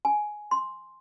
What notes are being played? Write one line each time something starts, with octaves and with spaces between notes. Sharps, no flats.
G#5
C6